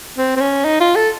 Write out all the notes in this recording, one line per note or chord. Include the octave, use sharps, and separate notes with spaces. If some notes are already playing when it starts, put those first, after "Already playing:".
C4
C4
C#4
D#4
F4
A4